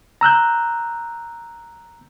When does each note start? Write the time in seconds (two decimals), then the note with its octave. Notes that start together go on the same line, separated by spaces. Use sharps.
0.21 A#5 E6 F#6 G6